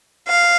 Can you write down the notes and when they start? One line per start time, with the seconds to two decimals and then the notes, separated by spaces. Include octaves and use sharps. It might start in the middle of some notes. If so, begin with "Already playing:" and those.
0.28 F5